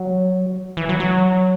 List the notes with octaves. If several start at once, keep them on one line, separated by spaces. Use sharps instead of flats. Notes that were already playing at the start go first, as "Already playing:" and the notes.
Already playing: F#3
E3
F#3
F#3